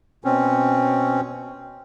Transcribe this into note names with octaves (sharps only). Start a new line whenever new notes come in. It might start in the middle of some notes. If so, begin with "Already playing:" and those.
B2 C4 C#4